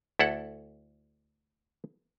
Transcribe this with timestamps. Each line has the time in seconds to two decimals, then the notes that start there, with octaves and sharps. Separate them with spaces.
0.19 D2 E4 A4 F#5